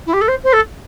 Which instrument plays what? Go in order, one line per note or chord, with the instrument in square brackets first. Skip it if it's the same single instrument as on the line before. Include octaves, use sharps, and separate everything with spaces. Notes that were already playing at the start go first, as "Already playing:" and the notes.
[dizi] E4
G4
A4
C5
C5
A4